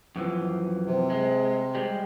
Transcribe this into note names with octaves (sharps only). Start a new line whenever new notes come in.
F#2 E3 F3
C3
G#3
G3 G#3